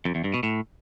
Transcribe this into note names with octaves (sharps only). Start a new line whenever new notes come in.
F2
E2
G2
B2
A2